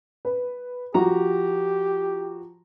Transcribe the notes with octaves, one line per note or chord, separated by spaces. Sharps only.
B4
F3 F#4 G4 A#5